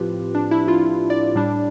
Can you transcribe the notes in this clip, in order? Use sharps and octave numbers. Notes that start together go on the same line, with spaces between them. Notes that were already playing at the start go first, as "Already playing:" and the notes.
Already playing: A2 F3 C4 F4 G4 B4
D4
E4
F4
D5
A2 G3 D4